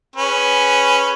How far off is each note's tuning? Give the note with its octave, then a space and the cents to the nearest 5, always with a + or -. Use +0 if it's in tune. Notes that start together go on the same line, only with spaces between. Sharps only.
C#4 +0 G#4 +0 B4 +0